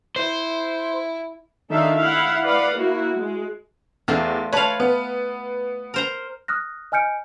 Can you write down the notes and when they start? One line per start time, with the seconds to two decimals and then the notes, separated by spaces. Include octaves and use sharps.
0.16 E4 C5
1.70 D#3 D4 D#4 A4 E5 F5
1.98 E4 F5 F#5
2.44 B4 D5 F5 F#5
2.78 A#3 E4 F#4
3.16 G#3
4.08 E2 A3 F4 C5
4.53 B4 C#5 F5 A5
4.80 B3
5.94 A#4 C5 A#5
6.48 D#6 F6 F#6 A#6
6.92 D#5 G#5 F6 G6 C#7 D7